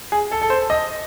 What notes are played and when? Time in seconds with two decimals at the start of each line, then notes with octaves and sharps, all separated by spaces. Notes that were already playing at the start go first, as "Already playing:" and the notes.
0.12 G#4
0.32 A4
0.42 A4
0.50 C5
0.70 D#5